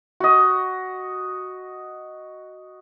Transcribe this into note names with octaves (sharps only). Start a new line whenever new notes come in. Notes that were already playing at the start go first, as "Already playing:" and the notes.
F#4 D#5